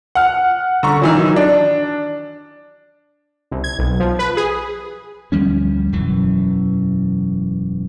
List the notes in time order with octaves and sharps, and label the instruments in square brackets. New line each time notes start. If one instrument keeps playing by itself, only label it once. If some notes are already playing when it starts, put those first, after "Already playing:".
[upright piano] F#5 F6
D3 A#5 C#6
D#3 E3 F#3
D4
[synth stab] C2
G#6
B1
F3
B4
G#4
[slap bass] D2 F3 G3 C#4
E1 F#2 E3